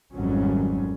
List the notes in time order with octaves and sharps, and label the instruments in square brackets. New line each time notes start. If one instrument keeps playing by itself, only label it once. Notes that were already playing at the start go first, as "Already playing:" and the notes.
[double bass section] G#1 F2 D#3 F#3 G3 C#4